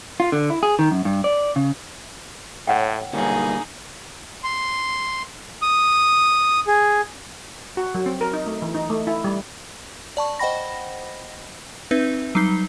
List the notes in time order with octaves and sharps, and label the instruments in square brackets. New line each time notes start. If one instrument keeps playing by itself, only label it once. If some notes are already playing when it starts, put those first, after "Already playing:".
[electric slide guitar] F4
D3
E4
G#4
D#3
F#2
G2
D5
C#3
[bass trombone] A2 [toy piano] C#5 F#5 G5
[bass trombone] B1 [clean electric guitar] D3 G3 A#3 [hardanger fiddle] D#4 G#4
[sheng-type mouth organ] C6
D#6
G#4
[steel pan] F#4
F#3
C4
A#4
D#4
A3
E3
D#4
A3
E4
G3
[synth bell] D5 A5 C#6
C5 D#5 F#5 G5 B5 A#6
C4 D#4 B4 E5
F#3 G3 D#4 C7 G7